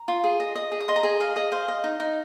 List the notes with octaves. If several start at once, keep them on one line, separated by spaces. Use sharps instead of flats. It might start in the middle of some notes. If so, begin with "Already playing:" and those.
Already playing: A#5
F4
G#4
D#5
D#5
G#4
D#6
D#5 C6
A#5
G#4 G#5
D#5 F5
G#4 D#5
C5 F5
D#5
D#4
D#4